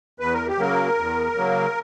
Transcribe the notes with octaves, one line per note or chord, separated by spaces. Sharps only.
E2 B4
A#4
G4
C#3 F#3 A#3 A#4
E2
C#3 F#3 A#3